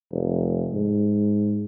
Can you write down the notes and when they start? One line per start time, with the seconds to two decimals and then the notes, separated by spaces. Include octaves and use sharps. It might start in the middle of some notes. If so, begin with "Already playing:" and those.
0.12 F1
0.73 G#2